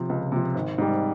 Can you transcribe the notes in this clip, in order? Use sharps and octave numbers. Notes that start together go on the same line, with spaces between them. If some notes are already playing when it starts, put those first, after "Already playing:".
Already playing: C3 F3
C#2
C3 F3
G#1
G#2 G3